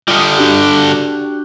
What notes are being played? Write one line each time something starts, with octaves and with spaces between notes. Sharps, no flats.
D3 G3 F4 D#6
D4 F#4 G4